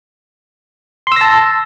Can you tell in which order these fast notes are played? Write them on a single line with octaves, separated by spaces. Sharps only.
C6 E6 A#6 A5